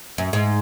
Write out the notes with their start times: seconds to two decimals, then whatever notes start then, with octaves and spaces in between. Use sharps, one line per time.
0.18 F#2
0.33 G#2